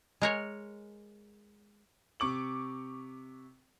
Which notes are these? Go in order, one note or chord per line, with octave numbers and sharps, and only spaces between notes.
G#3 A#4 C#5
C3 C#6 D6 F#7